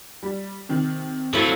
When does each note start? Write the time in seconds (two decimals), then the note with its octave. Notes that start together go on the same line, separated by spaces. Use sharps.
0.23 G3
0.69 C3 D#3
1.33 F#3 C4 E4 F4 A4 E5